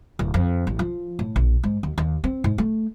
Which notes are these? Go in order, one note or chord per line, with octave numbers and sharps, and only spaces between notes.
D1
F2
A1
F3
A2
A#1
G#2
D#2
D#2
C4
G#2
A3